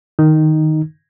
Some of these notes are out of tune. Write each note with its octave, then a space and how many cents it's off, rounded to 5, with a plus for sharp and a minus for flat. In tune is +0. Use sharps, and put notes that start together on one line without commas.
D#3 +0 D#4 +0